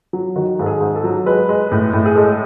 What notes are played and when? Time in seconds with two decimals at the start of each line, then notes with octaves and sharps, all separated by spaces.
0.13 F#3
0.36 D#3 F#4
0.59 G#2 A4
0.66 G#4
0.81 G#2
0.96 A4
1.04 F#3
1.26 G#3 B4
1.49 G#3
1.72 A2
1.93 A2
2.06 G#4
2.16 G#3 A4